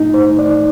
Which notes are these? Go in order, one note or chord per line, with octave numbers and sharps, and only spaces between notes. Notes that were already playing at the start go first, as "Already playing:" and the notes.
Already playing: A2 A3 D#4
C5
D5